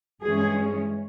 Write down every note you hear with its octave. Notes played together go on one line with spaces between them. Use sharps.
G2 E3 G#3 C#4 G#4